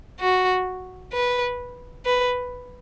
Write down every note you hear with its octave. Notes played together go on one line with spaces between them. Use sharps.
F#4
B4
B4